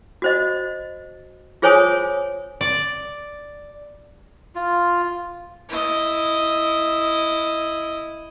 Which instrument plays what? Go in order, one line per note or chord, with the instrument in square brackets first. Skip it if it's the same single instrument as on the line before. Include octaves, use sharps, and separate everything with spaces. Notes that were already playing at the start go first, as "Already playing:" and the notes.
[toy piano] F#4 C5 D#5
F4 G#4 C5 C#5 G#5 D#6
[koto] D5
[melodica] F4
[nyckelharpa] E4 D#5